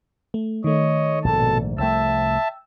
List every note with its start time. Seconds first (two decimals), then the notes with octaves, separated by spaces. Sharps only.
0.34 A3
0.64 D#3 A3 C#5 D#5
1.24 A#1 G#2 B2 A4 A5
1.78 C2 F3 A3 E5 G5 A5 E6